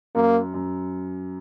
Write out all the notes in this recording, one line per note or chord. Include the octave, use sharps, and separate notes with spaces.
F#2 A#3
F#2